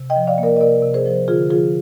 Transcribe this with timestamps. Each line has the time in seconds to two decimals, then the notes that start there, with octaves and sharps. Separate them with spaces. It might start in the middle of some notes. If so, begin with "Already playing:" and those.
Already playing: C3
0.10 D#5 G5
0.16 F3
0.27 D5 F5
0.38 A#3
0.43 A#4 D5
0.56 D#5
0.60 C3 A#4 D5
0.83 C3
0.94 G#4 C5
1.06 F3
1.28 D3 F4 G#4
1.50 F3 F4 G#4